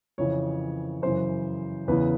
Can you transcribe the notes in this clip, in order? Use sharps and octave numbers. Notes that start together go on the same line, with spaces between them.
F2 C#3 E3 C#5
F#2 C#3 E3 C5
E2 C#3 E3 B4